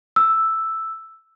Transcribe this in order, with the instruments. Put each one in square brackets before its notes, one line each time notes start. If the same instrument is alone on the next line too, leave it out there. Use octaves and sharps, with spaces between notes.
[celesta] E6